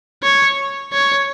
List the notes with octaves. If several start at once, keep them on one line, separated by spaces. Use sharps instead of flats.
C#5
C#5